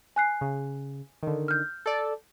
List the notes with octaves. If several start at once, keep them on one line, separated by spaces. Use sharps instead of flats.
G#5 F#6 C7
C#3
D3 D#3
F6 G6
A4 D5